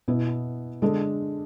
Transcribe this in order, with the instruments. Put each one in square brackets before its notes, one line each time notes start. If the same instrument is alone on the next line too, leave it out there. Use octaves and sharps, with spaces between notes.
[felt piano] B2 B3 E4
D3 G#3 D4 A4